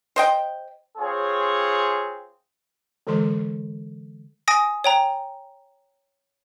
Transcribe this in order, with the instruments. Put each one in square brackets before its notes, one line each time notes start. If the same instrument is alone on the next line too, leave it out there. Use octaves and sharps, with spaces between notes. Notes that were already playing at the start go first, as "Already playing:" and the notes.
[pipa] C5 D#5 G5
[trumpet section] C4 F4 G#4 C#5
[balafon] D3 E3 G#3 A4 C6
[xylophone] G#5 D#6 A#6 D7
C#5 G5 A#5